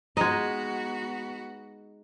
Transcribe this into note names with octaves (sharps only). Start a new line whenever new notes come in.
G#3 B3 D#4 F#4 D#5